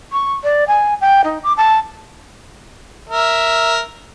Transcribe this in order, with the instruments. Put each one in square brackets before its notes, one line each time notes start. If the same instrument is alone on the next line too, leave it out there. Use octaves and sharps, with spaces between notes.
[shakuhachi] C#6
D5
G#5
G5
D#4
D6
A5
[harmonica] A#4 E5